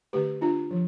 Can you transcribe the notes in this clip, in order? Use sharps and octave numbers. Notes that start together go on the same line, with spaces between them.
D3 A3 D4 G4 B4
D4 F4
F3